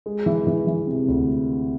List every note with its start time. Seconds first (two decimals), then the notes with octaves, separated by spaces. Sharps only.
0.06 G#3
0.26 E3
0.47 E3
0.67 E3
0.87 C3
1.08 D2